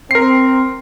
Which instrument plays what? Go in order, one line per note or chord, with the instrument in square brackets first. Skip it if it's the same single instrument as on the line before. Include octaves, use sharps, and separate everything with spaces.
[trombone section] C4 [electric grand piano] A#4 C7